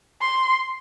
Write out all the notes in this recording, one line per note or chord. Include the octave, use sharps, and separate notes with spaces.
C6